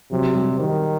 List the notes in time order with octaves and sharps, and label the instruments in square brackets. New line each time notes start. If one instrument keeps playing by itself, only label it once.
[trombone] C3 [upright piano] F#3
[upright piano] G3
[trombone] D#3